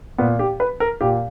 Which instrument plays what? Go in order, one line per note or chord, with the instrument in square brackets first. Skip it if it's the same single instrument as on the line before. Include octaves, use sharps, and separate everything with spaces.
[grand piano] A#2 B3
G4
B4
A#4
A#2 G4